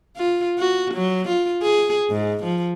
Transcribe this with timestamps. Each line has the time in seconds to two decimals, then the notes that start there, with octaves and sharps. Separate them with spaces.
0.17 F4
0.59 F#4
0.94 F#3
1.28 F4
1.62 G#4
2.10 G#2
2.44 F3